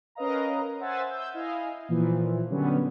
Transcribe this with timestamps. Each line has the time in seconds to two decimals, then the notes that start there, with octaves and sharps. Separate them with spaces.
0.15 C#4 A#4 B4 D#5 F5 A#5
0.79 C5 E5 F#5 G#5 E6 A6
1.10 E6 G6
1.32 E4 D#5 F5 G#5
1.88 A#2 E3 F3
2.50 D3 F#3 G3 B3 C#4